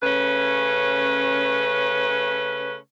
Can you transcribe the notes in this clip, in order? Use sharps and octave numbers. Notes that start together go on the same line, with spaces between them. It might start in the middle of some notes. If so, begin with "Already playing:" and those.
C#3 A3 C#4 B4